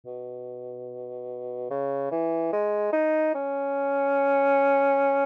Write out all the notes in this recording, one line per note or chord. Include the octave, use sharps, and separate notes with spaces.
B2
C#3
E3
G#3
D#4
C#4